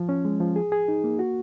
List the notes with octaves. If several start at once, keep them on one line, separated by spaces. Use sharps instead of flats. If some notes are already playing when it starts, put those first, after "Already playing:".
Already playing: F3
C#4
G#3
F3
G#4
G#4
D#4
A#3
F#4